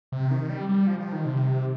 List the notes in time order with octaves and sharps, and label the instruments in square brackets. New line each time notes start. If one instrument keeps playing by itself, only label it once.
[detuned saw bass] C3
D#3
G3
G3
F3
F3
D#3
C3